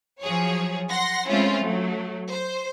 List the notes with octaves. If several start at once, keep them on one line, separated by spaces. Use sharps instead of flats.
F3 F#3 G#4 C#5
F#5 C6 A#6
G#3 A3 C4 C#4 E4 F4
F#3 A3
C5